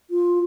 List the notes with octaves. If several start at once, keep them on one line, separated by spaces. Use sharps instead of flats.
F4